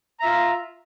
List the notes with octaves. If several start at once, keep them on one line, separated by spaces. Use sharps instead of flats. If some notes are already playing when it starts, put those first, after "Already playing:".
F4 E5 A#5